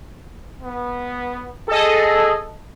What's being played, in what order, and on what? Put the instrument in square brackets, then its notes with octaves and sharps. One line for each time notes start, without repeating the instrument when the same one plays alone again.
[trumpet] B3
[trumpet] G#4 [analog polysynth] A4 D#5